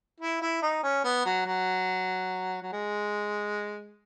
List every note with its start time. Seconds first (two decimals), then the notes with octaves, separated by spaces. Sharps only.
0.21 E4
0.42 E4
0.63 D#4
0.84 C#4
1.05 B3
1.26 F#3
1.46 F#3
2.62 F#3
2.73 G#3